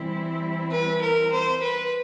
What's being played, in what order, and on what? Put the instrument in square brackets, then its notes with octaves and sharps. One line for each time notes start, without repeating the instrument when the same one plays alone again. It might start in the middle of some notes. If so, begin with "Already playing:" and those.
Already playing: [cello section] E3 G3 C4 E4
[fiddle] B4
A#4
C5
B4